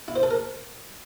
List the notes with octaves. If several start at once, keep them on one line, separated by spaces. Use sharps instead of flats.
E4
C5
A4
A#4